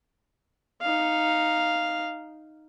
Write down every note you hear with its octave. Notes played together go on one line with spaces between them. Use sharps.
D#4 F5